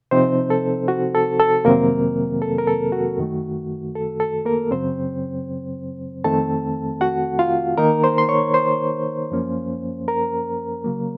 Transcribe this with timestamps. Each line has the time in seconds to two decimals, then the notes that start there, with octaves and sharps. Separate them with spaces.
0.11 C3 F3 C4 D#4 C5
0.50 A4
0.88 F#4
1.15 A4
1.40 A4
1.65 F2 C3 D#3 F#3 A#3 C4 A#4
2.42 A4
2.58 A#4
2.67 A4
2.92 F#4
3.18 F#2 D#3 A3
3.95 A4
4.20 A4
4.45 A#3 A#4
4.71 F#2 C#3 F#3 C4 C5
6.24 F2 D#3 A3 C4 A4 A5
7.01 F#4 F#5
7.39 F4 F5
7.78 D#3 A#3 D#4 A#4 A#5
8.04 C5 C6
8.18 C6
8.29 C#5 C#6
8.54 C5 C6
9.31 F#2 F3 A#3 C#4
10.08 A#4 A#5
10.84 C#3 F#3 A#3